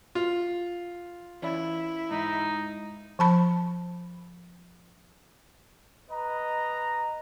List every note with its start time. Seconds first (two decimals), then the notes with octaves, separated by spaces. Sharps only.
0.15 F4
1.42 E3 C#4 E4 D5
2.11 G#2 D#4
3.19 F3 A5 B5
6.11 B4 D#5 A#5